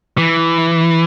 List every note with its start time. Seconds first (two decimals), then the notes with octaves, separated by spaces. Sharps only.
0.18 E3